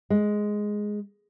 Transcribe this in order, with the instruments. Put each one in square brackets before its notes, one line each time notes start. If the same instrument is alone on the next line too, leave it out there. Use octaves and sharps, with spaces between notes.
[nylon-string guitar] G#3